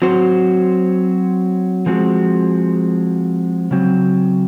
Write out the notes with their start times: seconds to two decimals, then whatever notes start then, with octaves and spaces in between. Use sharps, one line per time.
0.02 F#3 C4 F#4 C5
1.86 F3 G#3 C4 F#4
3.71 C#3 F#3 C4